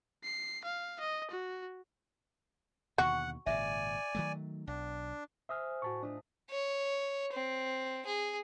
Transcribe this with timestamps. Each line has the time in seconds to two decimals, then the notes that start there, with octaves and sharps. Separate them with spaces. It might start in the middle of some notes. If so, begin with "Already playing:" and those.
0.24 C7
0.65 F5
1.00 D#5
1.31 F#4
2.98 D#2 B2 D3 F#4 F#5 G#5 C#6
3.46 G#1 A#2 C#3 D5 E5 G#5
4.15 D#3 F#3 A3
4.67 B1 D4
5.49 C5 E5 G#5 D#6 F6
5.82 A2 F#4 A5 C#6
6.03 A3 D4 F4 D#5
6.50 C#5
7.33 C4
8.06 G#4